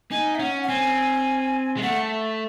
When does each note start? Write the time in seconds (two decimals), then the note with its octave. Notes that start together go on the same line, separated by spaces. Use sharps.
0.11 D#4 G#5
0.35 E5
0.39 C#4 F#5
0.63 F#5
0.68 C4 G#5
1.77 G#3
1.82 A3 F#5